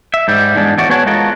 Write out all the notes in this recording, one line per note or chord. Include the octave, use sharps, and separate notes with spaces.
E5
G#2 G3
E2 G#2 G#3 D4
E2 A2 F#4 D5
B3 F#4 G#4 C#5 F#5 A5
G#3 B3 F4 F#4 A4 A#4